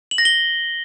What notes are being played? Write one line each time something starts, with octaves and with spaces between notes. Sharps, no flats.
F#7
A#6
G7